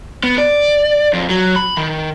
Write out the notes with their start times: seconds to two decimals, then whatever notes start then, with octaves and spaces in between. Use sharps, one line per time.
0.23 B3
0.38 D5
1.13 F2
1.29 F#3
1.56 B5
1.77 D#3